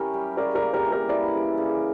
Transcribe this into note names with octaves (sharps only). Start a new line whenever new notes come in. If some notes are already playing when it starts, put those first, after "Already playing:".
Already playing: C#4 E4 G4 A#4
G3
C#3 A#4 D5
A#4 D5
A#3
G4 A#4
E3
G4 A#4
E4 A#4 D5
C#3
C#3